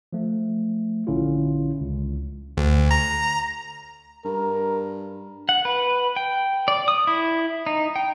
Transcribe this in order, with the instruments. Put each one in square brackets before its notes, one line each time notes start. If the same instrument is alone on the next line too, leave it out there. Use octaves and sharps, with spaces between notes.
[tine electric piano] F3 A3
A#1 D3 C#4 E4 F4
C#2
[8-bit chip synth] D2
A#5
[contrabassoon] G2 [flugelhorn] A#4
[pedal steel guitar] F#5
B4
G5
D5
D#6
E4
D#4
G5